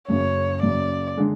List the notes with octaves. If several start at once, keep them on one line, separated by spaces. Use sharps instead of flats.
F#1 F#2 C#3 C#5
F#1 F#2 C#3 D5
D3 G#3